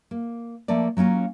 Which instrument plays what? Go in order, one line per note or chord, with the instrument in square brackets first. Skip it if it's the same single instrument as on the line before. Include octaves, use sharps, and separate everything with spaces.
[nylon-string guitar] A#3
F3 A3 A#3 D5
F#3 A#3 C#4 F4